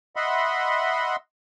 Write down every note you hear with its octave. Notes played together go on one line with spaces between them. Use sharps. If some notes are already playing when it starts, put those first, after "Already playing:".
D#5 E5 F#5 B5 C6